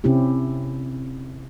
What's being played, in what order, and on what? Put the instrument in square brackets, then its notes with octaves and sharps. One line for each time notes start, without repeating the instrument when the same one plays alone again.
[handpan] C3 C4 C#4 E4 G4